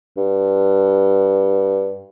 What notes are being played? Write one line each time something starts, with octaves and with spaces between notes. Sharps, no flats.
G2